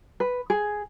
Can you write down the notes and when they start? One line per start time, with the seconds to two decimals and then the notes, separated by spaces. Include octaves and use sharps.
0.20 B4
0.50 G#4